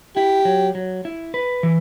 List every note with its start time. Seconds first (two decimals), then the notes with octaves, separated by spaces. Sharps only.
0.16 E4 G4
0.45 F#3
0.75 F#3
1.05 E4
1.34 B4
1.63 E3